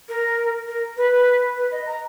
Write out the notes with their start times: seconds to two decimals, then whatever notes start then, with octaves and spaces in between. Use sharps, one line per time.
0.09 A#4
0.67 A#4
0.97 B4
1.57 B4
1.72 D#5
1.86 A#5